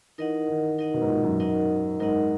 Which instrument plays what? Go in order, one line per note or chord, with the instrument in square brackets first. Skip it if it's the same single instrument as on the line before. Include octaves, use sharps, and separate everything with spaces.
[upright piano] E3 [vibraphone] D#4 A#4 D#5 F#5
[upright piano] D#3
[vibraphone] D#4 A#4 D#5 F#5
[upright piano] B2
G#2
A#2
F#2
[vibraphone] D#4 A#4 D#5 F#5
[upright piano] G#2 [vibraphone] D#4 A#4 D#5 F#5